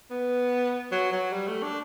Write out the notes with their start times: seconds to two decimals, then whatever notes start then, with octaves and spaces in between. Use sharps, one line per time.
0.10 B3
0.91 F#3
1.12 F#3
1.32 G3
1.47 A3
1.63 D4